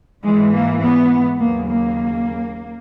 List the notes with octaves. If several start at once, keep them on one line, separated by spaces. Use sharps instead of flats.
G#2 E3 G#3
A#3
B3
D#2 C#3 F#3 A#3
A#3